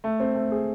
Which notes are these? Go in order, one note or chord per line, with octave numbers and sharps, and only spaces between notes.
A3
C4
A3
G#4